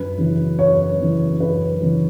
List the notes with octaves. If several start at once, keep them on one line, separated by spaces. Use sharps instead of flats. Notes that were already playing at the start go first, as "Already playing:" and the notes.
Already playing: F#2 B4
C#3 E3
F#2 C#5
C#3 E3
F#2 B4
C#3 E3